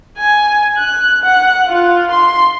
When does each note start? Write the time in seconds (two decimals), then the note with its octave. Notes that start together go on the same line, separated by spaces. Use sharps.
0.18 G#5
0.78 F#6
1.24 F#5
1.68 F4
2.12 C6